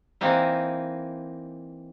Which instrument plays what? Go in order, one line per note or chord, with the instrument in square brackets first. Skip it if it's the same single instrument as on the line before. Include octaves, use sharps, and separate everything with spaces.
[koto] E3 A#3 C4 D#4 E4